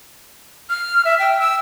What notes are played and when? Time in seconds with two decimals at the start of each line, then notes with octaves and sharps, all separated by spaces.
0.70 F6
1.05 E5
1.19 G5
1.40 E6